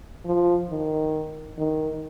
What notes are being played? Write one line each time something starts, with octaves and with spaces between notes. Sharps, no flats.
F3
D#3
D#3